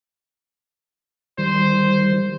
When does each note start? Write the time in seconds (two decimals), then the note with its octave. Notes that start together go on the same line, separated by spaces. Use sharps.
1.38 D#3 G3 C5